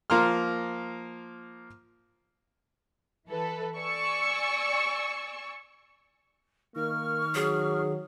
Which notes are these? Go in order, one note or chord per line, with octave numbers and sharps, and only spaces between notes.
F3 A#3 A#5 C6 F6
E3 A4 B4
D5 G#5 C#6 E6
D#3 A#3 C#6 F6
F#3 G#4